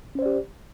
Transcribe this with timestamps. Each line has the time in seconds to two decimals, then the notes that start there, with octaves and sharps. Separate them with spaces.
0.15 C#4
0.19 C5
0.22 D5
0.26 G4